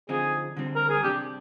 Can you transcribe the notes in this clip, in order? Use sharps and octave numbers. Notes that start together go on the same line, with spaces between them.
D3 F3 C4 D#4 G#4
D3 G3 C4
A#4
G#4
C3 G3 D4 G4